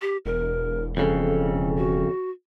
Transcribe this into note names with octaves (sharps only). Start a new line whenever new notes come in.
G4
E1 A#4
F2 C#3 A4
F#4